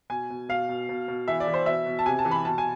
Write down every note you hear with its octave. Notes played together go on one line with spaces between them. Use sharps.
B2 G#5
B2
B2 F5
B2
B2
B2
E3 E5
D5
E3
C5
B2 E5
B2
A5
C3 G#5
A5
E3
B5
B2 A5
G#5